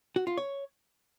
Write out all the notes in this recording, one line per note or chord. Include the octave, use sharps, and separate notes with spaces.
F#4
F4
C#5